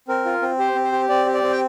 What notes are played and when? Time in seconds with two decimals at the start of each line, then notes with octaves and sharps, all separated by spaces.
0.08 C4 A#4
0.25 F4
0.42 C4
0.59 G4 C5
0.76 C4
0.84 C5
0.92 G4
1.09 C4 D5
1.27 G4
1.34 D5
1.43 C4
1.52 G5